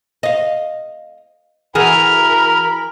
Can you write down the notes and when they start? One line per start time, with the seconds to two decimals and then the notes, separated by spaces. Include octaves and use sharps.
0.23 D#5 F5
1.75 E3 F#4 G#4 A#4 B5 F6